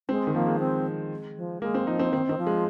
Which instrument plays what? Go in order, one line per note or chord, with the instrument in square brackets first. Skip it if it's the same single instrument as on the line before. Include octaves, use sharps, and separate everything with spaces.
[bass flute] G#3 [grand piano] C4
[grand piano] D#3
[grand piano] F3 [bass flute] A#3
[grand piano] G#3
[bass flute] C4
F3
[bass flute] G#3 [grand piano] A#3
[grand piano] C4
[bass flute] F3 [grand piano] D#4
[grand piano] C4
[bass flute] D#3 [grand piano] C4
[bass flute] D#3 [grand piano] C4
[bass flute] F3
[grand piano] G#3